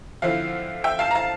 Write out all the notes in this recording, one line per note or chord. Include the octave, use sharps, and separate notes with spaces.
D3 F3 C4 E4 F5
E5 G5
F5 A5
A#5
F5 A5